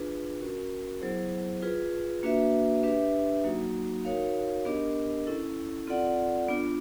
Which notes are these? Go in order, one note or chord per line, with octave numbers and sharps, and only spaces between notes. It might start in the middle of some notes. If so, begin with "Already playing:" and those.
Already playing: D4 F4 G#4 B4
C#4 F#4 A#4
F#3 B3 E4 G#4 C5
F4 G#4 B4
A#3 D4 F#4 B4 E5
D4 G4 B4 E5
F#3 A#3 D#4 F#4
D#4 F#4 A#4 C#5 F5
B3 D4 G4 A#4 D#5
C#4 E4 A4
C4 F4 A4 D5 F#5
B3 D4 F4